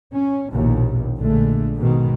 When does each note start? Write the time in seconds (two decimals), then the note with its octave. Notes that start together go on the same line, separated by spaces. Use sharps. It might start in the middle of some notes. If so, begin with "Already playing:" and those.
0.14 C#4
0.52 A#1 D#2 B2
1.18 A#1 D3 G#3 A3
1.77 G#2 B2 D#3